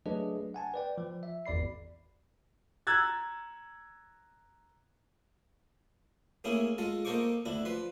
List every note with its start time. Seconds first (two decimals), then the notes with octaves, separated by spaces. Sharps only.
0.06 F#3 A3 D4 G#4 B4 D#5
0.54 F#5 G#5 A5
0.74 B4 D5 G5
0.98 F3
1.23 E5
1.46 G#1 E2 D5 B5 C7
2.87 A#5 E6 F#6 G#6 A6
6.44 A3 A#3 C#4 E4 G#4
6.78 G#3 F4 A4
7.05 A#3 D#4 A4 C5 C#6 D6
7.45 D2 D4 E4
7.65 F3 B4 C6